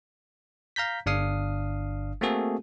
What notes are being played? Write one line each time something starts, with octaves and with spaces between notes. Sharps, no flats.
F5 A#5 G6 B6
G1 D4 F5 D#6 C7
A3 A#3 C4 F#4 G#4 A4